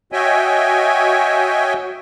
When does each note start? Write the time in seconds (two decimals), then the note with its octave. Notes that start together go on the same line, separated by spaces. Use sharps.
0.12 F#4 C#5 D#5 E5 G5 G#5